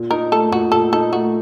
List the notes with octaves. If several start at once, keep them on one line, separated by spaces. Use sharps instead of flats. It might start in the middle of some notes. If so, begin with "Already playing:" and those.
Already playing: A#2
D#4 A#4
A3 A4
A#2 F#4
A#2 A4
D#4 A4
A3 F#4